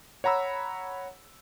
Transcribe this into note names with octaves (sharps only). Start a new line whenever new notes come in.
C#5 F#5 A#5 B5 E6